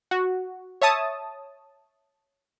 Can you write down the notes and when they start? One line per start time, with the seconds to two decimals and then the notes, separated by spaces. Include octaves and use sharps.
0.11 F#4
0.82 C#5 E5 A5 D#6